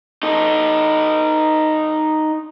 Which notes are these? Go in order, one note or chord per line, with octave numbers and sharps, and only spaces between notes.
D#4 A4